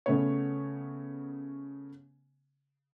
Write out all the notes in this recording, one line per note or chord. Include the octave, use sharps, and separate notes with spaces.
C#3 A3 B3 B4 C#5